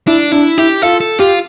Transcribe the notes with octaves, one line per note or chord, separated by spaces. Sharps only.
D4 E4
D4 E4
E4 G4
F4 A4
A4
F4 G4